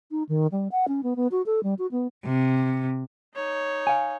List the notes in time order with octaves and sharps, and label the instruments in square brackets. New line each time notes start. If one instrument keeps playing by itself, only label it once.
[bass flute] D#4
D#3
G3
F#5
C#4
B3
B3
F#4
A4
G3
F#4
B3
[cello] C3
[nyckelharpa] D#4 C#5
[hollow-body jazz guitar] F5 G#5